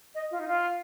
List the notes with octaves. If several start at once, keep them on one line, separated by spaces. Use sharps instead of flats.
D#5
F4
D#4
F4